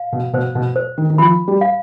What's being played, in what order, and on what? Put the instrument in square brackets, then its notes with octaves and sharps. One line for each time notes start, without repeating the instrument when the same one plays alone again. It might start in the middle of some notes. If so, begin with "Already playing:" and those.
Already playing: [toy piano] F5
[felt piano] B2
[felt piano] B2 [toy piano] C5
[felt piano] B2
[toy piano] C5
[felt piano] D#3
D#3
[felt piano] F3 [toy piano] B5
[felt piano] G3
[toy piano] F5